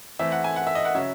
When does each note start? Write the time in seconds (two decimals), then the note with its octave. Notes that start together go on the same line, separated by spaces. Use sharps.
0.19 E3 A3 C4 E5
0.32 F#5
0.44 G#5
0.56 F#5
0.67 E5
0.75 D#5
0.85 F#5
0.95 C#3 F#3 C#4 E5